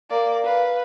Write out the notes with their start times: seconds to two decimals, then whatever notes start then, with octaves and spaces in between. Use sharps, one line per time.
0.10 A#3 D5
0.44 B4 F5